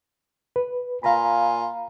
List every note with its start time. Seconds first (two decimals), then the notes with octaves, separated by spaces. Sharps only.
0.56 B4
1.03 A#2 F4 F5 G#5 A#5 B5